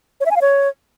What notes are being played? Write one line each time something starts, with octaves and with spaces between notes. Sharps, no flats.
C#5
E5
G#5
F5
C#5